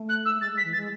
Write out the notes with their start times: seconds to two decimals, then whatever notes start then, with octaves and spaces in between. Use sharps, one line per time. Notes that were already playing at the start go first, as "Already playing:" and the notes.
Already playing: A3
0.09 F#6
0.25 E6
0.36 A3
0.40 G#3 A6
0.52 G#3 B6
0.64 E3
0.73 A6
0.77 G#3